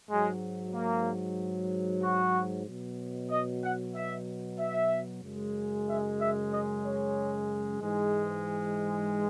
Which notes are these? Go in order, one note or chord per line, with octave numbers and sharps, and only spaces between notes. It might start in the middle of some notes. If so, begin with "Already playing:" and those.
G#2 F#3 G#3
A#3
F#4
B2 F#3
D#5
F#5
E5
E5
F#2 C#3 G#3
E5
E5
D#5
C#5
G#2 E3 G#3